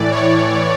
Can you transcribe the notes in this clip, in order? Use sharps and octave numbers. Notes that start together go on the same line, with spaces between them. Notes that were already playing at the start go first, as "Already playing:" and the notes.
Already playing: A2 E3 D5
C#5